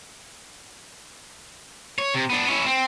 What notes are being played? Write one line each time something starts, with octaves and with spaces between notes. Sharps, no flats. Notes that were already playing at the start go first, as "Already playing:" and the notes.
C#5
C3
B3 D4
C#4 E4
C4